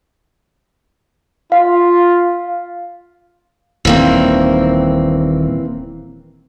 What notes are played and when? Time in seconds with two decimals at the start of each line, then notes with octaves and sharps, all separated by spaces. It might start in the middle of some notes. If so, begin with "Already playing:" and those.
1.52 F4 F5
3.85 D#1 D#3 E3 A#3 C4